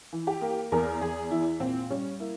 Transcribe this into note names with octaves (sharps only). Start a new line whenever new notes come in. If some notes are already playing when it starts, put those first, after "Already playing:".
E3
G4
A#3
E2 A#4
E2 G#4
E3 E4
A#2 C4
G3 C#4
A#3 E4